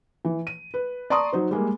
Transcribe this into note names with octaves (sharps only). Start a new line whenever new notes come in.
E3
D#7
B4
D5 A5 A#5 C6 C#6 D#6
F#3 D#4 C5
G3 G#3 A#3